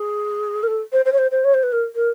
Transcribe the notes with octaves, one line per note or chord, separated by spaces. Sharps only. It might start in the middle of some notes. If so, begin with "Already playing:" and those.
Already playing: G#4
A#4
A4
C5
C5
C#5
C5
C5
C#5
C5
B4
A#4
A#4